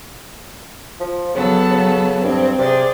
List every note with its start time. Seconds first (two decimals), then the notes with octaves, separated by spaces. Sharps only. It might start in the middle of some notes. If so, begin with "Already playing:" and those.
1.00 F3
1.35 C#3 F#3 B3 A4
1.70 C#3
2.23 G2 C4
2.59 C3 G#4 C5 D5